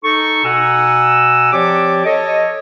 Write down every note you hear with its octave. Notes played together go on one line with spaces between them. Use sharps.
D#4 A4 C#6
B2 F#5 G#5 A#5 E6
F3 C4 G4 C#5 D5 D6
A4 C#5 D#5